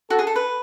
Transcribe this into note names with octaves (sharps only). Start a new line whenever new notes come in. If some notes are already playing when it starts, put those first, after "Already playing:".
F#4 A4
G#4
A4
B4